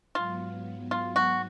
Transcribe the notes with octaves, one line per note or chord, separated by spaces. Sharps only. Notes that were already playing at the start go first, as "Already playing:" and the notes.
G#2 F#3 B3 F4
F4
F#4